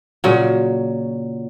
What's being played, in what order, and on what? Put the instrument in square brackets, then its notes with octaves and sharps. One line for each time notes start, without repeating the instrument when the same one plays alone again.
[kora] A#2 C#3 F#3